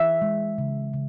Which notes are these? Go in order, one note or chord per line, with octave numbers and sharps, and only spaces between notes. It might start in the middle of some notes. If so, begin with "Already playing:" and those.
Already playing: E3 E5
G#3
C#3
C#3